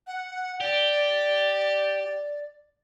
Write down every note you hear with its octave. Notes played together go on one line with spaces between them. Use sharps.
F#5
G4 D5